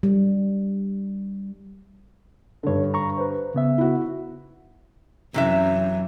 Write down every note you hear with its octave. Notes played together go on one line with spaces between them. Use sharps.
G3
G2 D3 A4 C#5
A#5 C#6
B4 C5
C#3 B3 E5
E4 F#4
F#2 C3 E3 E5